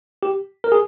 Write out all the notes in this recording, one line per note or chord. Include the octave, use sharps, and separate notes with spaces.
G4
A#4
G#4